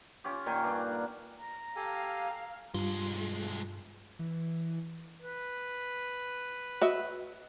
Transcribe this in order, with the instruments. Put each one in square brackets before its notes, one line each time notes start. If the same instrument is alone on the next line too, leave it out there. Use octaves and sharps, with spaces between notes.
[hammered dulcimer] C#4 F4 G4
A#2 D#3 G5 G#5
G2 D4
F#5
[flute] A#5
[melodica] G4 A4 G#5 [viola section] F5
[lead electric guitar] B1 G#3 [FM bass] G2 [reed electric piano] G3 F4
[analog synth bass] E3
[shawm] B4
[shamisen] F#4 D#5 E5